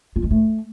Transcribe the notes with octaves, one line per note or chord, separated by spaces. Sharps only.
F4
G#3
A3